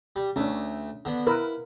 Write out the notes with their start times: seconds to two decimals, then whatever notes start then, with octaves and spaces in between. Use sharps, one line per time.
0.16 G3
0.36 D2 A3 C#4 D4
1.05 D3 B3
1.27 E4 A#4 B4